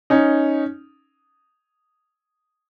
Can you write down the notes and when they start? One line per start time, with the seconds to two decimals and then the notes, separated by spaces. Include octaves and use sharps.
0.10 C#4 D#4